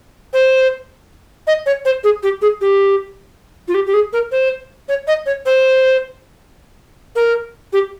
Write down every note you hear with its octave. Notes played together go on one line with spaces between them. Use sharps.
C5
D#5
C#5
C5
G#4
G4
G#4
G4
F4
G4
G4
G#4
A#4
C5
C#5
D#5
C#5
C5
A#4
G4